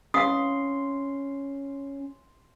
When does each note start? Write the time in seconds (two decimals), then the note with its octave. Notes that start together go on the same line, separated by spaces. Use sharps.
0.14 C#4 F5 C6 D#6